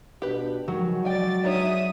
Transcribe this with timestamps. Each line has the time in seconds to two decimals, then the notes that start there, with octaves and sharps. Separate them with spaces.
0.22 B2 D4 F#4 G4 B4
0.68 D#3 F#3 G#3 F#4
1.05 D5 G5 G#5 A6
1.43 D4 D#4 C#5 E5 D#6